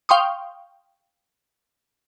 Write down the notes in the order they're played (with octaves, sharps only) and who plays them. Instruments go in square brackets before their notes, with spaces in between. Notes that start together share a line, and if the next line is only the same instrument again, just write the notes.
[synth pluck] F5 G5 C6 C#6 D#6